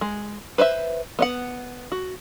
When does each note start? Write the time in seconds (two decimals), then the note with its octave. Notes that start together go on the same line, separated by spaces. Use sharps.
0.01 G#3
0.58 B4 C5 D5 E5
1.19 B3 D#5 F#5
1.92 F#4